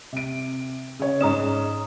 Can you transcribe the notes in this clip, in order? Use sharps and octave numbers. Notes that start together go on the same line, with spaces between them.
C3 D7
C#3 C#5
G#2 C#4 A#5 D#6 E7